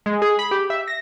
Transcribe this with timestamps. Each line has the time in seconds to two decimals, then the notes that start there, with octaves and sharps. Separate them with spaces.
0.06 G#3
0.22 G#4
0.39 B5
0.51 G4
0.70 E5
0.88 A#6